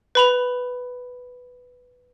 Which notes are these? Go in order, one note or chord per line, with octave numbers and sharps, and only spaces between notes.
B4 B5 F7